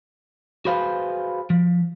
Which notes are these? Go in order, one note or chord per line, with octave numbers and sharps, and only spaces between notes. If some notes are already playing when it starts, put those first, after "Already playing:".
F#4 G#4 B4 C5 F5
F3